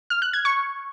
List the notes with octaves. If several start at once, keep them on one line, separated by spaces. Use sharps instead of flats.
F6
F#6
G#6
C#6